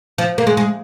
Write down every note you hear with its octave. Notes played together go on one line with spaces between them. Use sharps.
F3
A#3
G#3
G#3